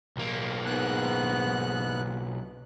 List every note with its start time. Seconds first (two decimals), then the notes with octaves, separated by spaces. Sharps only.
0.17 B1 A#3
0.66 G#2 B3 F#6